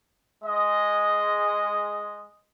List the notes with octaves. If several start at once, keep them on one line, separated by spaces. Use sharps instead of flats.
G#3 D#5